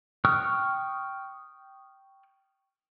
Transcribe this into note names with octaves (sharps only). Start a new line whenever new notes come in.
G5 C#6 D#6 F6 F#6